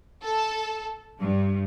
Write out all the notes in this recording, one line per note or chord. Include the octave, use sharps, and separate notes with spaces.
A4
G2